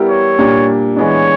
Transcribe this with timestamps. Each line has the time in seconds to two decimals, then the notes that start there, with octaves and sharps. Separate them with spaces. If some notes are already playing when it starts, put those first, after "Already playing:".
Already playing: G3 B3 E4 G4 A#4
0.10 C#5
0.39 A#2 G3 A#3 D4 G4
0.96 E3 G#3 B3 D4 C#5